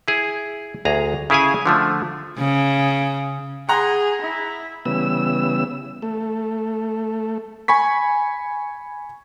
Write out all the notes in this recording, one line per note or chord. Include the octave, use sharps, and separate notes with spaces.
E4 G#4
D2 G#4 A#5
C#3 E4 G#4 F5 G#5
D3 F3 A3
C#3
G#4 F#5 A#5 C6
E4
C#3 E3 G3 B3 E6
A3
G#5 B5 C#6 B6